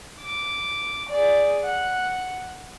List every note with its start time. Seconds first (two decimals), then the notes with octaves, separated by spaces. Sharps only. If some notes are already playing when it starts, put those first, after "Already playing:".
0.20 D6
1.09 G#4 D5
1.64 F#5